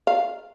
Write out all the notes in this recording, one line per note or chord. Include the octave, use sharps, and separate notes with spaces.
F5